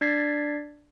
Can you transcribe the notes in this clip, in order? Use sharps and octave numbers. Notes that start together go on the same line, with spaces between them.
D4 D5 G#6 A6 B6 C7